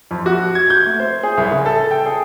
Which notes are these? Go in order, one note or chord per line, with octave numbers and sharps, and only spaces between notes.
F2
F#4
G#6
G6
A3
C5
G#4
C2
C#3
A4
G5
G#4